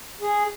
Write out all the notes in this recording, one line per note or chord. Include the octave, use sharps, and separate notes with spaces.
G#4